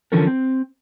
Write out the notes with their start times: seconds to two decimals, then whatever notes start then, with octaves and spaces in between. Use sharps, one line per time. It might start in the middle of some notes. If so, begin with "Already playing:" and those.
0.12 D3 E3 F3 C#4 A4 A#4
0.27 C4